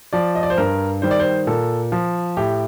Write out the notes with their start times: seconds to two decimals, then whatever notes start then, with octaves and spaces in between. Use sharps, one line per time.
0.13 F3 D5
0.35 D#5
0.43 D5
0.50 C5
0.57 G2 A#4
1.02 D#3 G3 C5
1.11 D5
1.19 C5
1.47 A#2 A4
1.92 F3
2.37 A2 G4